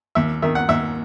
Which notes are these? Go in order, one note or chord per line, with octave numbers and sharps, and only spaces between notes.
D#2 E5
D#3 E5
F#5
D#2 E5